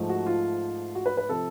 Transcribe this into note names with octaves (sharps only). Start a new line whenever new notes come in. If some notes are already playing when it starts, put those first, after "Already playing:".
Already playing: G#2 F3 A3
F#4
F4
F#4
B4
B4
C3 F3 A4